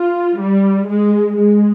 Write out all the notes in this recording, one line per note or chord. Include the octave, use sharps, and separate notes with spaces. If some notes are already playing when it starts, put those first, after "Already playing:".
Already playing: F4
G3
G#3
G#3